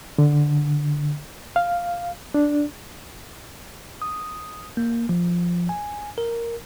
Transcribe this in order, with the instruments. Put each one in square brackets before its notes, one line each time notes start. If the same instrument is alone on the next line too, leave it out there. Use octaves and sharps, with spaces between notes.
[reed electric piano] D3
F5
D4
[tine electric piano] D#6
A#3
F3
G#5
A#4